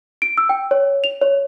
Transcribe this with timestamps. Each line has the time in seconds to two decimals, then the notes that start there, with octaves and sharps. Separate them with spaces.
0.22 D7
0.38 E6
0.49 G5
0.71 C#5
1.04 F7
1.22 C#5